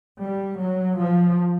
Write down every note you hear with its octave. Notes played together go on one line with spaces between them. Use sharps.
G3
F#3
F3